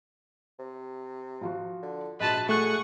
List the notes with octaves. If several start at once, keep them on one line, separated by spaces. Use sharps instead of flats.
C3
F3 F4 F#4
D3
A#1 G#3 F#4 B4 A5
A3 G#4 F#5 C#6 F#6